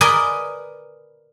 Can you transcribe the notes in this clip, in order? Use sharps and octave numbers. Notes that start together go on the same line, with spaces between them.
A#4 B4 D5 D#5 G#5 B5